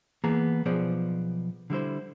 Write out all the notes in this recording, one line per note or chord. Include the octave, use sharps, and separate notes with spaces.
E3 A#3 B3 G#4 A5 A#5
B1 F3 B3 G#4 C5 D5
D3 G3 E4 C5